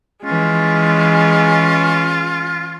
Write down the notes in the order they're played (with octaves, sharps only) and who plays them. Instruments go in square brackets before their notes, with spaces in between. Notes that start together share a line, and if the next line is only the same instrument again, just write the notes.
[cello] E3 C#4 [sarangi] G#3 [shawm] F4